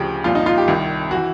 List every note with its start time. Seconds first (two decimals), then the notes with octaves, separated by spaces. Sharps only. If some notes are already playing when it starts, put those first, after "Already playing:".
Already playing: D2 C#3 F3 G4
0.24 C2 A#2 F3 F4
0.35 D#4
0.46 F4
0.57 G4
0.68 C2 C3 D#3
1.11 E3 F#4